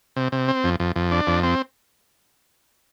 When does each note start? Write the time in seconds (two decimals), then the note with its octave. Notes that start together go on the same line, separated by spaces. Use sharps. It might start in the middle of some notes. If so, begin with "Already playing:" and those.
0.16 C3
0.32 C3
0.48 C4
0.64 F2
0.80 F2
0.96 F2
1.11 D4
1.27 F2
1.43 C4